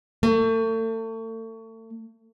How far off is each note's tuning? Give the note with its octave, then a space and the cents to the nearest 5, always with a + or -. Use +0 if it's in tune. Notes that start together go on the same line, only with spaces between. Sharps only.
A3 +35